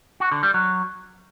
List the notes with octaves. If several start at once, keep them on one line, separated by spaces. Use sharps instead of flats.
F#4
D3
G3
F#3